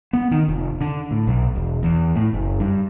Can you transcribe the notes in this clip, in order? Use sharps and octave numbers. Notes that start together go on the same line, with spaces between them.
B3
D#3
F1
D3
A2
B1
E1
E2
A2
F#1
G2